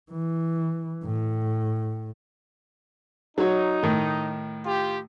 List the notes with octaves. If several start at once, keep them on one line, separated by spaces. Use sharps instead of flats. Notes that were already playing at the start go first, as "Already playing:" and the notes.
E3
A2
F#3 D#4 C#5
A2 D#3
F4 G4